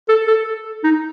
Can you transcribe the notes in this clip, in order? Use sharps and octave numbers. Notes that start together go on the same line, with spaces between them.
A4
A4
D#4